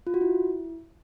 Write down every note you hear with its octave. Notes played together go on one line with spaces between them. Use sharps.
F4
F#4
E4